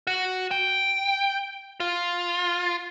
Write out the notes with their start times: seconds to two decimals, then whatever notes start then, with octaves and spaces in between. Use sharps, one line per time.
0.07 F#4
0.51 G5
1.80 F4